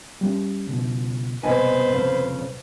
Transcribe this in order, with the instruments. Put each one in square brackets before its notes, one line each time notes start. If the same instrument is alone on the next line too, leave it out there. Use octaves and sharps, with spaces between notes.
[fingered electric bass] G3 C4 C#4
C#2 B2
[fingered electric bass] D#1 C2 [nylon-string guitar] B2 D#5 G#5 [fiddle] B4 C5
[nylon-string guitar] F2 C#3